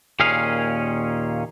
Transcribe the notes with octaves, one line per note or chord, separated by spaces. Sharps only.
D#2 A#2 C#4 G#4 F5